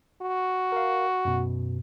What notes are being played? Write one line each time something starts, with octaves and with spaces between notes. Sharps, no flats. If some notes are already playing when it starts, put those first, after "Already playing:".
F#4
A#4 F5
F#2 B2